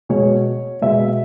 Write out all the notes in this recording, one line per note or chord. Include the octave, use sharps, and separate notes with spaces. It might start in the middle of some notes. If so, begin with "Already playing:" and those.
B2 G#3 C#5
B2 G#3 E5